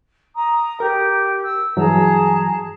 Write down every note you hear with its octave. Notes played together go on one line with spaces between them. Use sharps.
A#5 D#6
G4 A#4
E6
G2 E3 F#3 G#4 A5 A#5